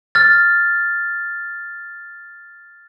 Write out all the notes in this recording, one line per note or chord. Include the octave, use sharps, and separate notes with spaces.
F6 A6